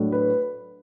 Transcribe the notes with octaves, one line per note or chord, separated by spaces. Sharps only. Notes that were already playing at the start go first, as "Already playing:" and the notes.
Already playing: A2 F#3 A3 D4
B4